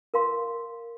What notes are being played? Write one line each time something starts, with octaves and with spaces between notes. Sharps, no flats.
A#4 F5 C6